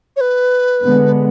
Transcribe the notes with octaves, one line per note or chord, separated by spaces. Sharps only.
C#5
B4
D3 G#3 B3